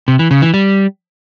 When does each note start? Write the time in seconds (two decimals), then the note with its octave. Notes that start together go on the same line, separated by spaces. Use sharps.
0.08 C3
0.19 E3
0.31 C#3
0.42 E3
0.54 G3